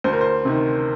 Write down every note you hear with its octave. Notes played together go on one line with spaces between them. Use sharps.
D2 C5
A#4
C5
C3 D#3